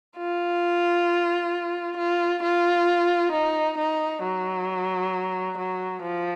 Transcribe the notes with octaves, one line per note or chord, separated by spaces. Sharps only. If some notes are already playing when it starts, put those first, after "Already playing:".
F4
F4
F4
D#4
D#4
F#3
F#3
F3